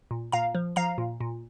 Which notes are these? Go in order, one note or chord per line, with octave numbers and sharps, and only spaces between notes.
A#2
A#2 F5 A#5
F3
F3 F5 A#5
A#2
A#2